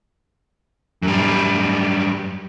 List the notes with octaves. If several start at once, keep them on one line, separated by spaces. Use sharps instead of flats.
F#2 G3